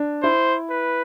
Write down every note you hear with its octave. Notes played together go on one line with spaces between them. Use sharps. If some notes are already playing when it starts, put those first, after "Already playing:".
Already playing: D4
E4 C5
B4